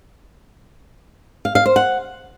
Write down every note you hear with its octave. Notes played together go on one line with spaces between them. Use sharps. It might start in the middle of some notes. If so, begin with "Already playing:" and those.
F5
F5
C5
F#5